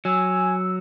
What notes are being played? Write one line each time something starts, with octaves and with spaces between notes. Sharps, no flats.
F#3 G#5 E6